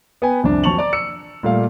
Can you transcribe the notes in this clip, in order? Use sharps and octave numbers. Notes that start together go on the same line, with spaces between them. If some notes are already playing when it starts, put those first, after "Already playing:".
B3 B4 G5 G#5
C2 F2 D4
F2 F#3 A5 C#6 F7 F#7
D5 A#5 D6
E6 C#7
A#2 G3 A3 D5 F5